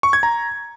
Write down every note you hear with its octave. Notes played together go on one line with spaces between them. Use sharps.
C#6
G#6
A#5